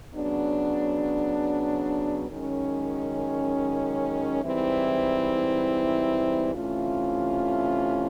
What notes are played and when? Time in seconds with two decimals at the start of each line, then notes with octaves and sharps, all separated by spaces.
0.13 C#3 F#3 B3 D4
2.27 F#2 D#3 G#3 C#4
4.41 G#2 E3 G3 C4 E4
6.53 C3 E3 A3 C#4 F4